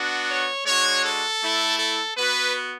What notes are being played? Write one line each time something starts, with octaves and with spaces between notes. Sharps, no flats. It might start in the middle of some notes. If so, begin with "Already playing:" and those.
Already playing: B3 D4 F#4
C#5
G#3 D4 F#4 C#5
A4
A3 E4
A4
B3 F#4 B4